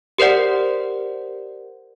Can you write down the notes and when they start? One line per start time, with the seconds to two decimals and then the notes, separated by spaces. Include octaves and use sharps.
0.18 G4 A#4 C5 D5 F#5